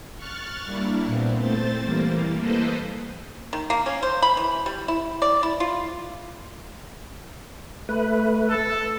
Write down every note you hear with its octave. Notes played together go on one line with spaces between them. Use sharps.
C#6 F6 F#6 A6
G3 A#3 D4 E4
A#2 B3 C4
A3 C4 C5 A6
E3 G3 A#3
A#3 A4 B4 C5 D#5
D#3
A#3
C#4
C5
B5
E3
G3
E4
D5
E4
F4
A3 B4
A4